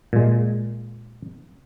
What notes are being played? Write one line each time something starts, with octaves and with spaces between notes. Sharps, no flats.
A#2 G#3